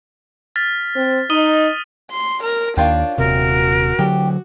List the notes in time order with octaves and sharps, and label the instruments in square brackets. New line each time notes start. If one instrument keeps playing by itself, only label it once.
[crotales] F6 A6 B6
[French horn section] C4
[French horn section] D#4 [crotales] D#6 D#7 G7
[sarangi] C6
A#4
[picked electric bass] D#2 [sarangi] D4 [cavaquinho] F4 C#5 G5
[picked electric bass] D#1 C3 [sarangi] F#4 [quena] A#4
[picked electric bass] D3 F#3 [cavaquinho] G4